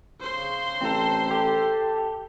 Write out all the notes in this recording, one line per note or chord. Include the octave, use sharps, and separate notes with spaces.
C#3 C5 C6
A1 C4 A4
G4 A4